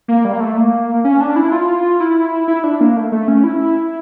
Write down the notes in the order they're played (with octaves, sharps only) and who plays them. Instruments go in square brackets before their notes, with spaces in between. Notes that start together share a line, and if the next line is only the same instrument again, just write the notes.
[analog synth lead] A#3
G3
A#3
A3
A#3
C#4
D4
E4
F4
E4
E4
D4
A#3
A3
A3
C#4
E4